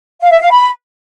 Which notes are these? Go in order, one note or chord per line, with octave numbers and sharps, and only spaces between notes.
F5
E5
F5
B5